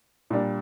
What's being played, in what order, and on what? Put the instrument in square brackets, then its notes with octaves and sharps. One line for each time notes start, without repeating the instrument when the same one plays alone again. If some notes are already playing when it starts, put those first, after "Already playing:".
[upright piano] A#2 G3 D4